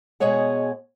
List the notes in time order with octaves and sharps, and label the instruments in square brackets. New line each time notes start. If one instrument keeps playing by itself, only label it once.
[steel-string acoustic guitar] B2 G#3 G#4 C#5 F#5